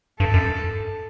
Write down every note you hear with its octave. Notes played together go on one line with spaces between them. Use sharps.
G2 A4
F#2